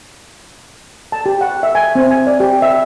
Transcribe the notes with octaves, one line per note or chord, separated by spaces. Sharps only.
A5
G4
F#5
E5
G#5
C4
G#5
D5
G4
E5